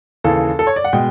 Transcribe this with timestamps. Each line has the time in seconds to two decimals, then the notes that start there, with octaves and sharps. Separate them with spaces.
0.24 D#2 C#3 E3 A4
0.59 A4
0.67 C#5
0.76 D5
0.84 F#5
0.93 B2 G#3 G5